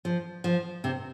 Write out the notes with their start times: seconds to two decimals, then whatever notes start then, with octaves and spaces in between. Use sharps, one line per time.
0.05 F3
0.44 F3
0.84 C3